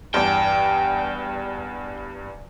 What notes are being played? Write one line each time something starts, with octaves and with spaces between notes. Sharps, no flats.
E2 G2 G5